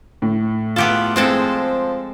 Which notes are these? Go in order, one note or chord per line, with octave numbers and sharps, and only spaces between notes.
A2
B3 F4 G4 A4
F3 G#3 C4 A4